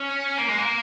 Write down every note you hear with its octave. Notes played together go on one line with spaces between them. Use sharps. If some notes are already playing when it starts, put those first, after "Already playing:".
Already playing: C#4
A#3
G#3
A#3